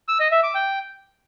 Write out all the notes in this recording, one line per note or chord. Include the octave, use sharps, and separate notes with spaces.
E6
D#5
E5
D6
G5